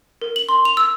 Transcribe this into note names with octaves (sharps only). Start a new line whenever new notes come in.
A#4
F#7
C6
F7
E6